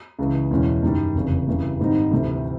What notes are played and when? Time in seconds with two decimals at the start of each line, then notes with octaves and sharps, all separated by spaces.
0.19 C#2 C#3 E3
0.51 E2 B2 G#3 C#4 E4
0.83 F#2 D#3 G3
1.15 F1 E2 C#3
1.47 F#2 C#3 E3 G3
1.80 G#2 D#3 G3 C4 D#4
2.11 D2 C3 E3 G3